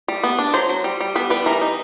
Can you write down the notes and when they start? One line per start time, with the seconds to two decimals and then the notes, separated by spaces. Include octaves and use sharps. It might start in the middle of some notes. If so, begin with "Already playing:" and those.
0.08 G3
0.23 B3
0.39 D4
0.54 F#3 C5
0.69 F#3
0.84 G3
1.00 G3
1.15 B3 B4
1.30 G3 B4
1.46 E3 A#4
1.61 D#4